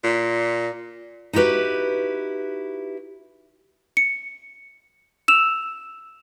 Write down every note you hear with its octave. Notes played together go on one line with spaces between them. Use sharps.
A#2
D#4 E4 F#4 G4 B4
C#7
E6 E7 F7